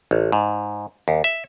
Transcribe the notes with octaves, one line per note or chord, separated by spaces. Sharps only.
A1
G#2
D#2
E5